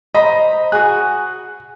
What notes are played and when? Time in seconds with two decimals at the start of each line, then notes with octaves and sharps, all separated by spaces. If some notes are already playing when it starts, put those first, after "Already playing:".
0.14 C5 D#5 A#5 B5
0.72 F#4 G#4 F#6